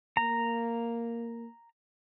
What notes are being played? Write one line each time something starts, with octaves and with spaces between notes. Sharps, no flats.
A#3 A#5